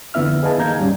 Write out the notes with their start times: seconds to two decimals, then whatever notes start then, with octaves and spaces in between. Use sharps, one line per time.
0.14 F2 D3 B3 E4 E5 F6
0.43 G#4 B4 D#5 F5 G#5 A5
0.58 D#2 A#3 F5 A#5 G6 G#6
0.77 G#2 G3 C#4